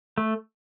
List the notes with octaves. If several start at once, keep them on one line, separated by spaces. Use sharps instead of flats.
A3